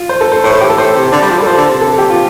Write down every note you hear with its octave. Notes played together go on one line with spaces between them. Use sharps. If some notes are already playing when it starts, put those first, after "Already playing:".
Already playing: F4
C5
A4
C5
A2 C5
A4
G4
A4
A2 C5
C3
D3 D5
G3
F3
G3
A4
F3 C5
D3
C3
A4
G4
F4